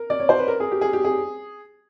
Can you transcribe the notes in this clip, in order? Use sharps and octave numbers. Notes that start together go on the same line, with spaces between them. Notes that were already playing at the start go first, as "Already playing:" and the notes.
Already playing: A#4
D5
C#5
C5
B4
A#4
G#4
G4
G#4
G4
G#4